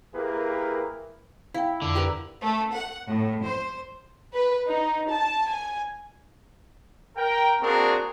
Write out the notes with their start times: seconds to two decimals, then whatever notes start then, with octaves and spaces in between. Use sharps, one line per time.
0.14 A#3 E4 G4 G#4 A#4 B4
1.54 E4 F5 G5
1.82 F2 D3
1.95 G4 A#4 B4
2.41 A3
2.73 F#5
3.09 A2
3.45 C5
4.34 B4
4.67 D#4
5.11 A5
5.49 G#5
7.16 A#4 G5
7.61 A#3 C4 D4 F#4 G#4 A#4